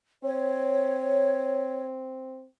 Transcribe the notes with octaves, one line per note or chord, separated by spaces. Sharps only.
C4 C#5